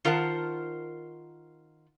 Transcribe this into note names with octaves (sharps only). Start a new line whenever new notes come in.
D#3 F4 A#4 C5 F#5 A5